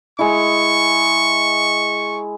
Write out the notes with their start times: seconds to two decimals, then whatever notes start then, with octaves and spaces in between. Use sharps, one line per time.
0.19 G#3 E4 C#6